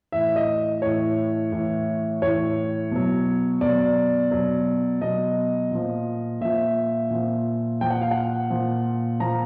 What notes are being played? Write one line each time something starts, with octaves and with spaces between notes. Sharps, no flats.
A2 E3 E5
D#5
A2 E3 C#5
A2 E3
A2 E3 C#5
B2 F#3
B2 F#3 D5
B2 F#3
B2 F#3 D#5
A#2 F3
A#2 F3 E5
A#2 F3
A#2 F3 G5
F#5
F5
F#5
A#2 F3
A#2 F3 A#5